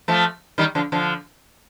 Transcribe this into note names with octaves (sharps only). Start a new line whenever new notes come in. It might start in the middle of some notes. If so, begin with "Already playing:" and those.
F3 A3
D#3 G3
D3 F3
D3 F3